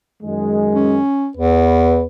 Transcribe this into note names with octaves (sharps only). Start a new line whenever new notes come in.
F#2 D#3 G#3
C#4
E2 B4